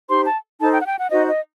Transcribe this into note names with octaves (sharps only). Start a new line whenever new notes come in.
D#4 G4 C5 C6
A5
D#4 A4 C5 A5
G5
F#5
G5
F#5
D#4 F#4 C5 D#5
D#5